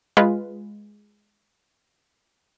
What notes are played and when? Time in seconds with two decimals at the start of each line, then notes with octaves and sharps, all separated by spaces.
0.17 G#3 F4 B4